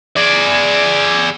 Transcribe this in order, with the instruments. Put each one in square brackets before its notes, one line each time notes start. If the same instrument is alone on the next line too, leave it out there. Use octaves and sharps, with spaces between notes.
[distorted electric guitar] G#4 D5